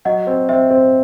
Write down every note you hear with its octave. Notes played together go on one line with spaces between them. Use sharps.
F#3 D#5 F#5
C4
C4 C5 E5
C4